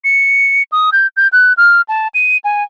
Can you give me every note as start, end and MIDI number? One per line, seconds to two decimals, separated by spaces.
0.04 0.63 97
0.72 0.90 87
0.92 1.07 91
1.17 1.28 91
1.32 1.53 90
1.57 1.81 89
1.88 2.08 81
2.14 2.37 99
2.44 2.63 80